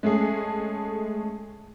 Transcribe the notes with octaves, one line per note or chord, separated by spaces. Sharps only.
G#3 A3 C#4 G#4 A4